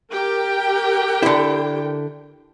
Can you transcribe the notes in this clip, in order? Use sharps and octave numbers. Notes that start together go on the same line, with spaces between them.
G4 A#4 G5
D3 E4